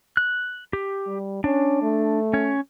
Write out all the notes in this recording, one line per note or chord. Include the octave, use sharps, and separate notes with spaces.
F#6
G4
G3
C#4 D4
A3
C#4 C#5